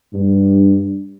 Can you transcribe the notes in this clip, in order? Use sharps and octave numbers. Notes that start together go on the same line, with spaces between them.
G2